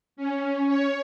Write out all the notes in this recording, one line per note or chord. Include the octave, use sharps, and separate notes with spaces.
C#4
C#5